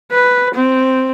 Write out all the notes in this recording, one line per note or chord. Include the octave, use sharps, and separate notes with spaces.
B4
C4